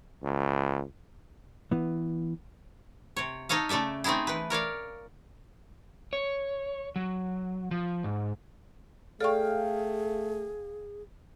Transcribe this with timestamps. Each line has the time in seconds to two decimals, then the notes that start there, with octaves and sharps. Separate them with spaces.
0.23 C#2
1.72 E3 B3
3.16 C3 C#5
3.49 D#4 A4 C#5 D#5 F5
3.69 C#3 A3 A4 D5 E5
4.04 A3 C4 D#4 E4 G#4
4.27 E3 B4
4.50 A#4 C#5 D5 F5
6.13 C#5
6.96 F#3
7.71 F3
8.04 G#2
9.20 A3 G#4 A4 D5 F5 G5 C#6